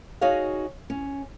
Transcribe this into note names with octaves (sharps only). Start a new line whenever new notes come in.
D#4 F#4 G#4 C#5 D#5 F5
C#4